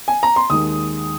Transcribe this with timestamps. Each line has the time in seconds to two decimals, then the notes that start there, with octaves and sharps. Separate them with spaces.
0.08 G#5
0.23 A#5
0.36 C6
0.50 D#2 D#3 G#3 D#6